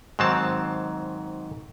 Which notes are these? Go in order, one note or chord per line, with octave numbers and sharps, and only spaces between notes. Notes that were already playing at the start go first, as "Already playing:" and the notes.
G#2 D#3 F#3 C4 A5